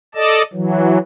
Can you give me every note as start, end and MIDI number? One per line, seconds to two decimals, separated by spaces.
0.15 0.42 69
0.15 0.42 74
0.15 0.42 75
0.15 0.42 81
0.53 0.98 52
0.53 0.98 54